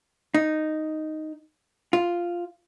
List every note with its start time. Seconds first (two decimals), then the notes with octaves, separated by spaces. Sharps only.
0.34 D#4
1.93 F4